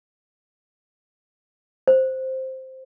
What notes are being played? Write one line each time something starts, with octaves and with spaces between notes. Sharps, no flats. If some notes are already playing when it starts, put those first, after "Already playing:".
C5